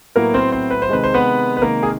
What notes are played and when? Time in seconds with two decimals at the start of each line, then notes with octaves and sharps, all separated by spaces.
0.15 A2 F#3 A#3 B3 E4 A#4
0.34 C4 C5
0.52 C4 C5
0.71 B4
0.82 C5
0.89 C3 D#3 G#3 B4
1.04 C5
1.14 B3 B4
1.57 B4
1.62 C3 D#3 G#3 A#3 A#4
1.83 G#4